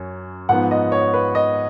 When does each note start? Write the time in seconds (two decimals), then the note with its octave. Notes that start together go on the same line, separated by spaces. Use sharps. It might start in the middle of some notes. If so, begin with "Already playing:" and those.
Already playing: F#2 C#4
0.49 G#2 F3 B3 F#5
0.71 D#5
0.92 C#5
1.14 B4
1.35 D#5